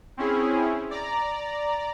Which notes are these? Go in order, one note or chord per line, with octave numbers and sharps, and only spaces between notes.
C4 C#4 E4 G#4
D5 A#5